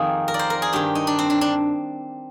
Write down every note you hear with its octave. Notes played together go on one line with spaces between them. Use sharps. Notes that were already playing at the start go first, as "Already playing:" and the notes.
Already playing: F2 D#3 A#3 C4 D#4 G#4
A#4
D5
C5
A#4
G#4
G2 D#3 G4
D#4
D4
C4
D4
D4